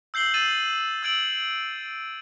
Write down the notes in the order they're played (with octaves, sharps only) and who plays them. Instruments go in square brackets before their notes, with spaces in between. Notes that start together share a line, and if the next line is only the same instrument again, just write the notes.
[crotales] E6 G6 C7 F#7 G7
E6 A6 C7 D#7 E7 F#7
E6 G#6 D7 F#7